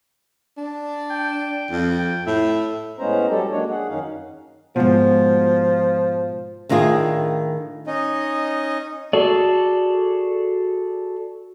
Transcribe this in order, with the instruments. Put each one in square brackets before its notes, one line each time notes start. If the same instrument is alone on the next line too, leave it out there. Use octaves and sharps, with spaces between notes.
[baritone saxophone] D4
[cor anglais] G5
[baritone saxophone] F2
[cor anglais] G5
[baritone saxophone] A2 [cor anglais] E5
[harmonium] A2 G#3 B3 C#4 C5 A#5
F#3 G3 G4 A4
F#3 G#3 A#3 D4 C#5
G#4 F#5
F#2 D#3 C#4 D#4 F5
[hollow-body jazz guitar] G#2 B2 [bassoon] F3
[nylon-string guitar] A2 D#3 D4 F4 G#4
[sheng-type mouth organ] C#4 D#4 D#5
[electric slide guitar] F#4 G#4 A4 D5